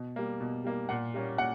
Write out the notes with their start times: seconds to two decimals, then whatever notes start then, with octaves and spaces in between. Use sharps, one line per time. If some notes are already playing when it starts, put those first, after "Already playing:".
Already playing: B2
0.16 G3 A#3
0.41 B2
0.64 G3 A#3
0.89 A#2 F#5
1.14 G3 A#3 C#4
1.38 A#2 F#5